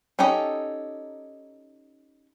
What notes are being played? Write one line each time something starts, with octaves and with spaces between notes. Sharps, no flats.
C#4 D#4 G4 A4 D#5